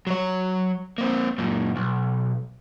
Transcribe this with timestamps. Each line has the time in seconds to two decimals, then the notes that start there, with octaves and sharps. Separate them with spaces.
0.07 F#3 C#5
0.98 A#3 C4
1.38 F#2 A#2
1.76 B1